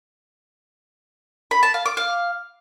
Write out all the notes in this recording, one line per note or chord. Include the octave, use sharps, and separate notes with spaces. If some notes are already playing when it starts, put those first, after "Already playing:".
B5
A5
F5
D6
F5